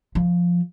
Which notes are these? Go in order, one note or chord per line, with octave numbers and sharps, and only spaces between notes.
F3